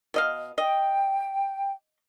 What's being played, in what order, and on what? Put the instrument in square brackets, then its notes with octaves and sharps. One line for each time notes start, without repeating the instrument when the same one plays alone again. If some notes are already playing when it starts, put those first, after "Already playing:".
[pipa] B2 D#5 F5
[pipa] D#5 [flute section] G5